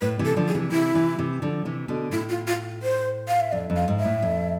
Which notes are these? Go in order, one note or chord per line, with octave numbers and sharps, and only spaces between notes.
A2 B4
C3 E3
A4
D3 F3
G#4
C3 E3
C3 E3 E4
C3 E3
C3 E3
D3 F3
C3 E3
B2 D3
A2 E4
F4
F4
C5
F5
E5
F2 D5
F2
F5
G#2
E5
A2
F2